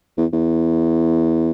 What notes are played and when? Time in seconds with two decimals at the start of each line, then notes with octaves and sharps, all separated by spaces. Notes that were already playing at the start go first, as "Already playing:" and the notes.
0.18 E2
0.33 E2